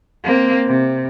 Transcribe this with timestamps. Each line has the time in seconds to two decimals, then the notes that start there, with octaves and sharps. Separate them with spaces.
0.24 A#3 C4
0.67 C3